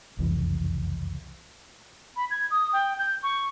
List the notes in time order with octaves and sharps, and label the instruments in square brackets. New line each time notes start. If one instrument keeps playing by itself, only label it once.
[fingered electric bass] F#1 C2 F2 E3
[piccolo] B5
G#6
D#6
G5
G6
C#6